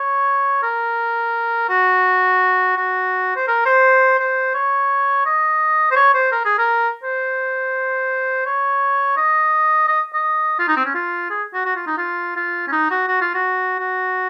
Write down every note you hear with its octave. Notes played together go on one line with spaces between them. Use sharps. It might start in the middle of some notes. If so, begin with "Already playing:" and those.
Already playing: C#5
A#4
F#4
F#4
C5
A#4
C5
C5
C#5
D#5
C5
C#5
C5
A#4
G#4
A#4
C5
C#5
D#5
D#5
D#5
F4
D#4
C4
C#4
F4
G#4
F#4
F#4
F4
D#4
F4
F4
C#4
D#4
F#4
F#4
F4
F#4
F#4